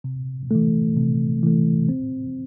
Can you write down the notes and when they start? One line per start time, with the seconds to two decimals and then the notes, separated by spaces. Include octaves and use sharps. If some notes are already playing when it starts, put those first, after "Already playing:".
0.04 C3
0.51 E3 A3
0.97 C3
1.43 E3 A3
1.89 C4